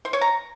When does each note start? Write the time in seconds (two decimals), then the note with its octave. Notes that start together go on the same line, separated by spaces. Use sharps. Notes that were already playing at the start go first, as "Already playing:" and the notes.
0.05 C5
0.13 C#5
0.21 A#5